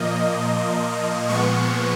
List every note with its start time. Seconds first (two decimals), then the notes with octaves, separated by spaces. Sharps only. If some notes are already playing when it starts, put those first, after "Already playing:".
Already playing: A#2 F3 A#3 D#5
1.29 A#2 F3 G#3 B3 C#6